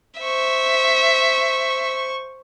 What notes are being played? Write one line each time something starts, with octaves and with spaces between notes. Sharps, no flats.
C5 E5 C#6